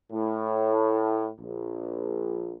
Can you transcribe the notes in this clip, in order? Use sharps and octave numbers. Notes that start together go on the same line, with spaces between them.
A2
A#1